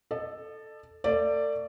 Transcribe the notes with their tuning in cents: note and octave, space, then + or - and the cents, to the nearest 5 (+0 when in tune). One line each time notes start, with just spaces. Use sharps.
A4 +0 D#5 -45
A3 +40 D5 +0